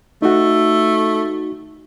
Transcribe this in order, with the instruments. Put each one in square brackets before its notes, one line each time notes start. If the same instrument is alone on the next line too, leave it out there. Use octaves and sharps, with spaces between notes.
[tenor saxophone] A3 [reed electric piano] D#4 F#4